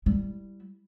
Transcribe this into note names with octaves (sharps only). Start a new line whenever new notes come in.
G3 E4